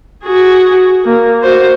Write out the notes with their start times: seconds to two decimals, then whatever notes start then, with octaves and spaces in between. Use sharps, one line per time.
0.24 F#4 G#4
1.05 A#3
1.43 F#4 C5